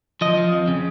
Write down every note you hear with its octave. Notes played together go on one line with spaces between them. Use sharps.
F3 D#5
F3
F2
C#3